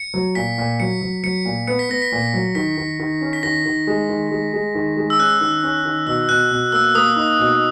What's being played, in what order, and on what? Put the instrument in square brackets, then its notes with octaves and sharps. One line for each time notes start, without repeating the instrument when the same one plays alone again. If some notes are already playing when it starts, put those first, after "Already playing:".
Already playing: [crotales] C#7
[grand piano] F#3
[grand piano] A#2 [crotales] B6
[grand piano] A#2
[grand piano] F#3 [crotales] C#7
[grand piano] F#3
[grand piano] F#3 [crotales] C#7
[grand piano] A#2
[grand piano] B3 [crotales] C#7
[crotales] B6
[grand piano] B3 [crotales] A#6
[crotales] B6
[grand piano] A#2
F#3
[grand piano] D#3 [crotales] B6
[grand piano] D#3
D#3
C#4
[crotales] B6
[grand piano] D#3 [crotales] A#6
[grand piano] D#3
G#3
D#3
G#3
G#3
D#3
G#3
[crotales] E6
[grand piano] C#4 [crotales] F#6
[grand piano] D#3
C#4
D#3
[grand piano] B2 [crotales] E6
[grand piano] B2 [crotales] F#6
[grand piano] B2
[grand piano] A#3 [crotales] E6
[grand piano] A#3 [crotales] D#6
[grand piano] D#4
B2